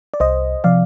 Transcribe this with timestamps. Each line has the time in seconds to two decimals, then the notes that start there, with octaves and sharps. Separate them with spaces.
0.14 D5
0.20 C2 C5 D#5
0.64 C3 F3 D5 F5